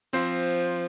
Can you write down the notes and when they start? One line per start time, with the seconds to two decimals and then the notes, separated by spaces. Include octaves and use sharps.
0.13 F3 C4 C5